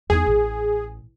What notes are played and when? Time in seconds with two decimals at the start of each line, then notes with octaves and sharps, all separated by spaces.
0.10 E2 D#4 G#4
0.26 A1